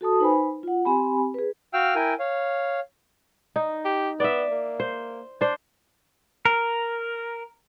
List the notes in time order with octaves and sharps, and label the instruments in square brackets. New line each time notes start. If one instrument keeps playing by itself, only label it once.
[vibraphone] F#4 A4 A5 D#6
D#4 B4 C5 G#5 B5
F4 F#5
C4 G4 G#5 B5
G#4 B4
[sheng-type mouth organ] F#4 F5 G5 E6 F6
E4 A#4 G5 G#5
C#5 F5
[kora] D#4
[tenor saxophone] G4
[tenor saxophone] B3 [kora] D5 E5
[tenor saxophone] A#3
[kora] C5
D4 C5
[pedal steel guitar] A#4